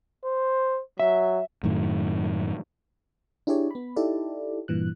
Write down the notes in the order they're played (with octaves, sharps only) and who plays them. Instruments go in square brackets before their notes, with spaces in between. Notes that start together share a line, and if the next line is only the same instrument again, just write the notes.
[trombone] C5
[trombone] F#3 [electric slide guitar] E5
[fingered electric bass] F#2 A2 D#3
[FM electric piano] D4 E4 G4 G#4 C#5 D5
B3 B5
D#4 E4 G4 A4 D5
G2 A#2 E3 F#6